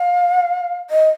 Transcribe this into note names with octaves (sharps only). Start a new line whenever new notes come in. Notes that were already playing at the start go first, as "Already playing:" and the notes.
Already playing: F5
D#5